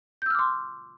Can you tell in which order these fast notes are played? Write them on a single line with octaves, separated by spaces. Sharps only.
G6 E6 F6 D6 C6